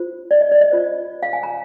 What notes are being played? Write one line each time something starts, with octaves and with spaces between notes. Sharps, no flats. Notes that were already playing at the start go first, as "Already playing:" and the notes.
Already playing: F4 C5
D5
D#5
D5
D#5
F4 C5
F5
G#5
A#5